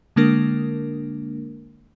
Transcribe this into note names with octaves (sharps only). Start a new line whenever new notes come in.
D3 G#3 A#3 D4 A#4